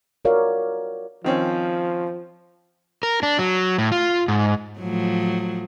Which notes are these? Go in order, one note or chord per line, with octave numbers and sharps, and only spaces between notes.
F4 F#4 A#4 C#5 D5 F5
D#3 F3 C4 C#4
A#4
D4
F#3
A2
F4
G#2
A2 F3 F#3